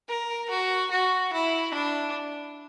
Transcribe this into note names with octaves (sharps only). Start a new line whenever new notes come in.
A#4
F#4
F#4
E4
D4